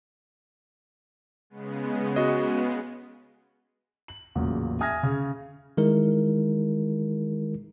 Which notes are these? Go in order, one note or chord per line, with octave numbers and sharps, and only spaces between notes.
C#3 G#3 B3
F#4 D#5
F#7
A1 E2 A#2 C#3 F#3
E5 G#5 D#6 F6 G#6 A#6
C#3
D#3 G#3 E4 A#4